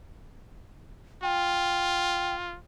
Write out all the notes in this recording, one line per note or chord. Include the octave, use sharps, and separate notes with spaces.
F4 G5